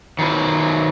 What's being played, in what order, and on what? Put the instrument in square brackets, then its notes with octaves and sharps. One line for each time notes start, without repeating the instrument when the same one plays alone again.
[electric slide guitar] D#3 F#3 B4